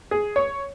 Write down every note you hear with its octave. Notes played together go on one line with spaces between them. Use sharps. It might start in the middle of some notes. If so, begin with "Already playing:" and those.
G#4
C#5